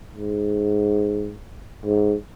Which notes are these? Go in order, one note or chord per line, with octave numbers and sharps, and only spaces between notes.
G#2
G#2